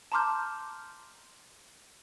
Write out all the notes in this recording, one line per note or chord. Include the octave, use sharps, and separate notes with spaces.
A5 A#5 C6 D6 F6 G6